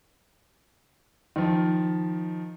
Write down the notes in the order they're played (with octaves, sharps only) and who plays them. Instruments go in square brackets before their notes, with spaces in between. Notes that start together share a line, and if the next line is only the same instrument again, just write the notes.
[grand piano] D#3 F3